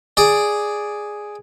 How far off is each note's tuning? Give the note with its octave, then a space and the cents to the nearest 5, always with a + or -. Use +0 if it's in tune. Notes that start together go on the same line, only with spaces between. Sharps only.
G#4 +0 D5 +0